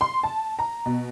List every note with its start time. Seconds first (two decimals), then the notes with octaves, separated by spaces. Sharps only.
0.01 C6
0.23 A5
0.59 A#5
0.86 B2